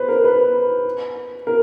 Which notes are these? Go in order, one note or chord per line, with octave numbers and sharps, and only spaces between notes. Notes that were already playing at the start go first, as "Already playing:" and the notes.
Already playing: B4 C5
A#4
B4
A#4